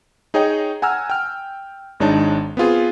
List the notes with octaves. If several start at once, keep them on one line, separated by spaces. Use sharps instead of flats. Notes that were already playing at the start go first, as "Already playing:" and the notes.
D#4 G#4 C#5 D#5 G5
F#5 G#5 A#5 E6 F6
G5 F6
G#1 G#3 D4 D#4 C#5 A5
B3 C4 F4 G#4